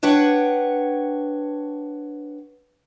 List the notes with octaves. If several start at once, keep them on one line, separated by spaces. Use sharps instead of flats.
D4 B4 C#5 F#5 G5